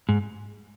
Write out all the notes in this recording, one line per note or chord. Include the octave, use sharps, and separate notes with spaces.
G#2